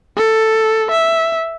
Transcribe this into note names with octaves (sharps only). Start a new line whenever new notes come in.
A4
E5